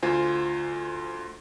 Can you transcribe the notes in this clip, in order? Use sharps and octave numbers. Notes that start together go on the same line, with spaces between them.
D2 F4 C5 G#5